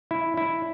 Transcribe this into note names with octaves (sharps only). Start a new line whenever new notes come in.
E4
E4